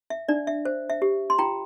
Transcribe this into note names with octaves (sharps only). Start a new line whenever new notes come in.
E5
D4 D5
E5
C5
E5
G4
C6
F4 G5 A#5